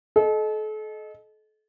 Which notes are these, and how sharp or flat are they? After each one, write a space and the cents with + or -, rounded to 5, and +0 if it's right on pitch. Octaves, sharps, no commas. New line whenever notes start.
A4 -35 D#5 -5